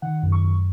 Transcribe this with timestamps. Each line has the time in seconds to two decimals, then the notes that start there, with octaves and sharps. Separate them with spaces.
0.02 D#3 F#5
0.23 F#2
0.32 C#6
0.42 F#2